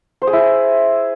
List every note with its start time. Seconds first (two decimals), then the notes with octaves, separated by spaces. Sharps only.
0.22 C5
0.27 G#4
0.33 E4